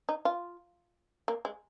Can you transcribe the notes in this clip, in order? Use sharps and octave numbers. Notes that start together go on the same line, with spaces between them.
D#4
F4
A#3
G#3